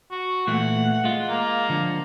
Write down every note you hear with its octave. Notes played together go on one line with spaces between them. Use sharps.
F#4
A#2 E3 A3 F#5
G#3 F4
A#3
D3 F3